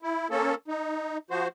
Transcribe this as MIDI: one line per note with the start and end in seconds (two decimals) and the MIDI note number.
0.02 0.28 64
0.30 0.55 58
0.30 0.55 61
0.30 0.55 69
0.68 1.18 63
1.30 1.48 53
1.30 1.48 66
1.30 1.48 72